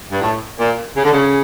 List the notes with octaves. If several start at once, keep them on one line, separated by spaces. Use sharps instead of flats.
G2
A2
A#2
C#3
D3
C#3